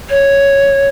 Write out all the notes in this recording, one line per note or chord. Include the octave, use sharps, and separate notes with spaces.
C#5